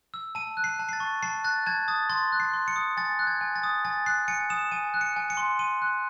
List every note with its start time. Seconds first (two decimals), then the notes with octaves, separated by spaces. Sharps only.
0.14 E6
0.35 A5 D#7
0.57 F#6
0.64 C7
0.79 A5
0.89 C7
0.93 A6
1.00 C#6
1.23 A5 C7
1.44 F#6 A6
1.66 A5 G#6
1.88 D#6 A6
2.09 C6 A6
2.32 F#6
2.40 C7
2.54 C6
2.68 C#7
2.76 D#6
2.97 G#5 A6
3.19 F#6
3.27 G#6
3.41 G#5
3.56 A6
3.63 D#6
3.85 G#5 A6
4.06 F#6 C7
4.28 G#5 C#7
4.50 D#6 E7
4.71 G#5 D#7
4.94 F#6
5.01 C#7
5.16 G#5
5.30 C#7
5.37 C6
5.59 C6 D#7
5.82 F#6